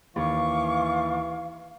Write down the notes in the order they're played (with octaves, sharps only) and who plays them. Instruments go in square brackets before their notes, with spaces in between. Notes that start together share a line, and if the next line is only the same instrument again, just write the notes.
[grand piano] D#2 [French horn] E3 [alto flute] F5 [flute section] C#6 D6